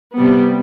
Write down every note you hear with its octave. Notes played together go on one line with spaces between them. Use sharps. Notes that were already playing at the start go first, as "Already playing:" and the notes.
C3 G3 B3